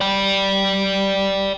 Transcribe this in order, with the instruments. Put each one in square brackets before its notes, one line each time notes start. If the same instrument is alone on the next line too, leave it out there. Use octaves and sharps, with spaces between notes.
[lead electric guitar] D5 G5